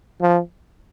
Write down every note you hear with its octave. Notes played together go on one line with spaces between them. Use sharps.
F3